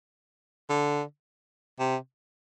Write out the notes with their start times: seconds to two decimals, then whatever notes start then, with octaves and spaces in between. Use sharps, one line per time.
0.69 D3
1.79 C3